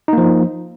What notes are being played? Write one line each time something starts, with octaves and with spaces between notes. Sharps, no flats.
F3 A#3 D#4